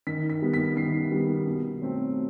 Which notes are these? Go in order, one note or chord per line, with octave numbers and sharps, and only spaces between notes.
D#3 B6
B6
G3 B3
B6
D#3 C7
G3 B3
B2
F#3 A3 C4